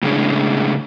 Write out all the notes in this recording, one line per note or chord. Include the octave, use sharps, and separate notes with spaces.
A2 C#3 G#3 D4 G#4